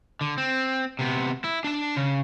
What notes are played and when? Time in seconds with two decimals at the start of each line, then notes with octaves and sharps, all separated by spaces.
0.21 D3
0.38 C4
0.99 C3 B3
1.44 E4
1.64 D4 A5
1.96 C#3